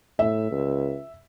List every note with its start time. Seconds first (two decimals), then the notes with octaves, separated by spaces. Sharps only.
0.19 A2 E5
0.51 C#2